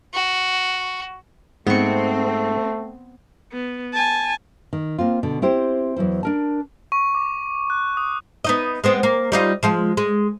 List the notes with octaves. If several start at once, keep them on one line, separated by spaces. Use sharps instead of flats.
F#4
G#2 A3 B3 C4 C#6
B3
G#5 A5
D#3
A#3 C4 F4
B2 D3
C4 E4 G4 C5
E2 F#3 E4 C5
D4 A#4 A5
C#6
D6
F#6
D#6
B3 D#4 D#5
G#3 B3 C4
A#3
G3 D#4 F4
F3 G#3 F4
G#3